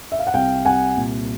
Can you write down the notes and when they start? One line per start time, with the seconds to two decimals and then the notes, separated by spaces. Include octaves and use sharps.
0.12 E5
0.19 F5
0.27 F#5
0.34 C2 F5 G5
0.65 C2 F#5 G#5
0.97 A#2